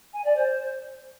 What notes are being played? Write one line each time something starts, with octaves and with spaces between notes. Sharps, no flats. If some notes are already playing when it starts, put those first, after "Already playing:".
G#5
D5
C5